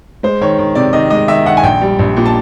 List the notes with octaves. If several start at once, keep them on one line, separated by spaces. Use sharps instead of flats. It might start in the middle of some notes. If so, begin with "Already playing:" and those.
G#3 C5
D#3 C#5
D#3
C3 D5
D#3 D#5
G#3 D#5
D#3 E5
D#3 F#5
G#5
A#1 G5
G3
A#1
A#2
A5